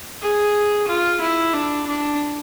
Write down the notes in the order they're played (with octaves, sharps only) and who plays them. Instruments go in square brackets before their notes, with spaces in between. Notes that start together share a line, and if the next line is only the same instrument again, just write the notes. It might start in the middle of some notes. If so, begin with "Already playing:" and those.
[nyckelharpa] G#4
F4
E4
D4
D4